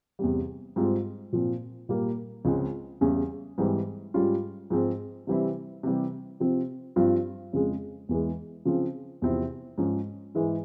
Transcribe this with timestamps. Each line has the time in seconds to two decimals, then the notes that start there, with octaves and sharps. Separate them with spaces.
0.19 E2 C3 G3
0.76 G#2 G3 C4 F4
1.32 A#2 F3 C4
1.89 A#2 G3 A#3
2.45 C#2 C#3 F3 G#3 C4
3.01 E2 C#3 G3 C#4
3.58 G#2 E3 G3 C4
4.14 G#2 G3 C#4 F4
4.70 G#2 F3 G#3 C4
5.27 C3 E3 G3 C4 E4
5.83 C3 E3 G3
6.40 C3 F3 C4
6.96 G2 F3 C4 F4
7.53 F2 C#3 F3 G#3
8.09 E2 E3 G#3
8.65 C#3 F3 C4
9.22 E2 C3 F3 C4 E4
9.78 G#2 F3 G#3 C#4
10.35 G#2 E3 G#3 E4